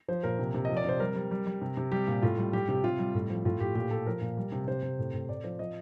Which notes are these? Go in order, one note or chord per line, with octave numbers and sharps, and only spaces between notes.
F3 C5
A#2 A#4
C3
C3
F3 D#5
D5
C3 C5
G3 A#4
G3
G3
G3
C3
C3
G3 G4
A#2
A2 F4
G3
G3 G4
C3 G4
C3 F4
G3
A2
F3
A2 F4
A2 G4
A#2 G4
A#2 A4
F3 A#4
A#2
G3
C3
C3 C5
C3
A2
A2
A2 D5
F3 C5
F3 D#5